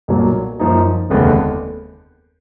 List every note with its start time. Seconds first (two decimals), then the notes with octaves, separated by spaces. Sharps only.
0.08 B1 A#2 F#3 A#3
0.60 F#2 F3 A#3 D#4
1.10 F1 D#2 D3 G#3 B3